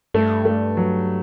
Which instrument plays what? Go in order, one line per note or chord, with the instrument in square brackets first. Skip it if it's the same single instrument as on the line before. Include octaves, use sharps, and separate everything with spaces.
[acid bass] G2 [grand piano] A3
[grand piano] A3
F#3